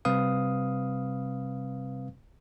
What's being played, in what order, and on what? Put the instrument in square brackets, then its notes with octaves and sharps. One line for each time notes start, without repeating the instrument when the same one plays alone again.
[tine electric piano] C3 G3 C4 B4 F5 D#6